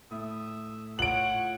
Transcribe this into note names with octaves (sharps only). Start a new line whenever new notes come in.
A2 E5 D#6
F4 C#5 F#5 D7 F#7